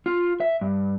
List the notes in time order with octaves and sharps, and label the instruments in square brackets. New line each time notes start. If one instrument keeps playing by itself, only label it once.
[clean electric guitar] F4
E5
G2